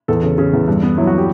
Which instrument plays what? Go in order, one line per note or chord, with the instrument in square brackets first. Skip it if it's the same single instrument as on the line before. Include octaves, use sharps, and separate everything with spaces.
[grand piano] E2 A4
C#3
C#3
E2
G2
B3
F#3 E4
F#4
G4